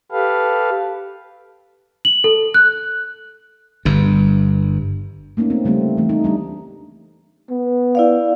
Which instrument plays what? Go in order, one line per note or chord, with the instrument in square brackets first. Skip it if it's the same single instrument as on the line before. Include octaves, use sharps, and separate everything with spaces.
[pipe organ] G4 A4 B4 F5
[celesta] F#7
A4
F#6
[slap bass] G1 G2
[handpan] A3 A#3 C#4 D#4
C4
C#3 G3 A3 C4
E3 A3
D#4
G3 D4
[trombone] B3
[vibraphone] E4 D5 F5